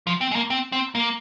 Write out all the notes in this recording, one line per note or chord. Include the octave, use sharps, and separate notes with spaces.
F3
C4
G#3
A#3
C4
C4
A#3